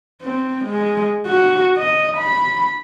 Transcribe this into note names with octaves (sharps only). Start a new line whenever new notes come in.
C4
G#3
F#4
D#5
B5